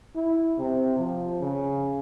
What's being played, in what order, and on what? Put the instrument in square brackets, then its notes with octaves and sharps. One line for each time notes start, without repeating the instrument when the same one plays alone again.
[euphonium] E4
C3
F3
C#3